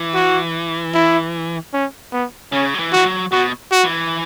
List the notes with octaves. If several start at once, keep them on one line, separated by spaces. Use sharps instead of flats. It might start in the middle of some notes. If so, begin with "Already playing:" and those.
Already playing: E3
F#4
E4
C#4
B3
C#3 C#4
F#3
E3
E3 F#4
F#3
B2 F#4
F#4
E3